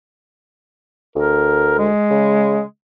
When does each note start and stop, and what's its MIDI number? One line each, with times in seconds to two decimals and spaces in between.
1.16 1.89 38
1.16 1.78 70
1.78 2.62 56
2.10 2.60 49